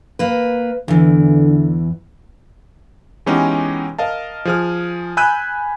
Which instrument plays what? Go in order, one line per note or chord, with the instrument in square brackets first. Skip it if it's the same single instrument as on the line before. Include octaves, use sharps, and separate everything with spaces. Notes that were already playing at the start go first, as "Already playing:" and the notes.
[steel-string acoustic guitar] A#3 B4
[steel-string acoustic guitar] E2 E3 [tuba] D3
[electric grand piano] E3 G#3 B3 C#4 D#4 G4
A#4 D#5 F5 A5
F3 G#4 F6
G#5 B5 E6 F#6 G6 D#7